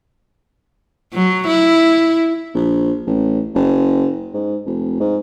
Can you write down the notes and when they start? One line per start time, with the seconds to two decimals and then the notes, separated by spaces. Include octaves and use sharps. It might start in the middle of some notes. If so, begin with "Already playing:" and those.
1.14 F#3
1.48 E4
2.55 A#1
3.07 A1
3.54 F#1
4.34 G#2
4.66 F1
5.00 G#2